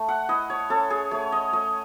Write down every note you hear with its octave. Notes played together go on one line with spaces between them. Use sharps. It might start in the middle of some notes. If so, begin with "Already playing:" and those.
Already playing: A3
F#5
E4 D#5
C#5
C#4 A4
G#4
A3 C#5
D#5
A3 D#5